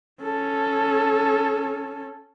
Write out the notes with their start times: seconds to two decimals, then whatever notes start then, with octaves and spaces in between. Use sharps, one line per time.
0.22 C#4 A4